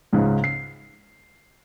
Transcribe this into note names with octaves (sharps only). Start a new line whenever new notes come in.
C#2 G#2 C#3
C7